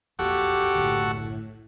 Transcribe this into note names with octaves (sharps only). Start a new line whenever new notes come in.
F1 A#1 E2 A#2 F#4 G4 A4 F#5
F#1 B1 A2 D3